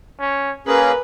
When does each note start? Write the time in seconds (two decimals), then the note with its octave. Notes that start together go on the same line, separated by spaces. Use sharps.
0.19 C#4
0.67 A#3 C#4 G#4 A#4 B4